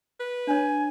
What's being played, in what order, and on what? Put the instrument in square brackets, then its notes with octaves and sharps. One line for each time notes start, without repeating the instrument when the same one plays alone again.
[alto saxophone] B4
[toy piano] D4 C#5 [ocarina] G#5